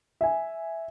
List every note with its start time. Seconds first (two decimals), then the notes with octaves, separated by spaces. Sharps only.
0.21 E5 G#5